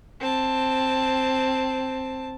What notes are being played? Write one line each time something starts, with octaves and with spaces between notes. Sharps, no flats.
C4 A5